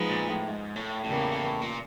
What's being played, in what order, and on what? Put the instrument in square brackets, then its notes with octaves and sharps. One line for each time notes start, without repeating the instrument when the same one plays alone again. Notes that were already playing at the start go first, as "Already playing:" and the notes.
Already playing: [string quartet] F3 G#3 B3 D#4
[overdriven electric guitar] A#2
A2
G#2
A2
[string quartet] E2 C#3 E3 G3 A#3 [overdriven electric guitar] A2
[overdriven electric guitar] A2
A#2